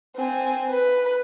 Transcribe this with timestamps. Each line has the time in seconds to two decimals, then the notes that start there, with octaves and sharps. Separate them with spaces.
0.16 C4 G#5
0.70 B4